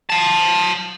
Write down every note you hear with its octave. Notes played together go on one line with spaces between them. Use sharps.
F5 A5